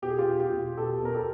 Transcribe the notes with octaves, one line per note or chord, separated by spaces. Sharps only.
B2 G4
G#4
F4 G4
B2
F4 G4
B2
B2 G4 A4
B2 A#4
G4 A4